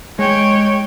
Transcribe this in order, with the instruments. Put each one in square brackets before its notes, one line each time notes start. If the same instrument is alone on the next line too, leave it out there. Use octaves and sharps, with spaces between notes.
[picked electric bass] G#3 [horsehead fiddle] C#5 G5